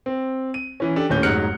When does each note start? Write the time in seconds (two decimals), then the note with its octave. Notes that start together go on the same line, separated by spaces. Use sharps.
0.06 C4
0.54 D#7
0.80 E3 C#4
0.96 D4 G4 A4
1.10 D#1 A2 C#4 G6
1.23 F1 G#2 F#3 F6 F#6 C#7